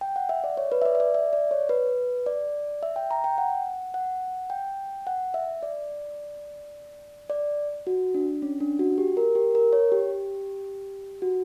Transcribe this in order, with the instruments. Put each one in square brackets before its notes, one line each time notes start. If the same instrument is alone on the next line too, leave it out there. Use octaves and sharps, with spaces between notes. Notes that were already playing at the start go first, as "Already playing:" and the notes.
[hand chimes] G5
F#5
E5
D5
C#5
B4
E5
D5
E5
D5
E5
D5
C#5
B4
D5
E5
G5
A#5
G5
F#5
F#5
G5
F#5
E5
D5
D5
F#4
D4
C#4
D4
F#4
G4
A#4
G4
A#4
C#5
G4
F#4